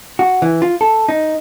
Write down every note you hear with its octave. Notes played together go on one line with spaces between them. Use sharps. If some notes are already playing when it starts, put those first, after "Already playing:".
F#4
E3
F4
A4
D#4